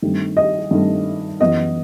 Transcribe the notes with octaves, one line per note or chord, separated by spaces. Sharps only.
G2 D#3 A3 C4
D#5
G2 D#3 A3 C4
F#2 E3 B3 D#5